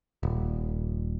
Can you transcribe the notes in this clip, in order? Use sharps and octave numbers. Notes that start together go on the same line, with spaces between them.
D#1